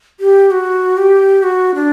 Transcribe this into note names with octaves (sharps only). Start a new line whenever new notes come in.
G4
F#4
G4
F#4
D4